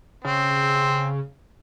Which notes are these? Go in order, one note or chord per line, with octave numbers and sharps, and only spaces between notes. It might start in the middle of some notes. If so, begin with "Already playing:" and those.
C#3 C4